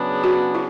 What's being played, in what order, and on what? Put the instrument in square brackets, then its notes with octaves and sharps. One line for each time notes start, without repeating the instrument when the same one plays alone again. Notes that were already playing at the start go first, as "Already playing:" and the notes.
Already playing: [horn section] C#3 F#3 B3 D4 G#4
[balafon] F#4
E4